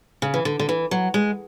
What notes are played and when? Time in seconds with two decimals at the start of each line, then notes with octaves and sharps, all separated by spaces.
0.22 C#3
0.34 E3
0.45 D3
0.59 D3
0.69 E3
0.91 F#3
1.14 G#3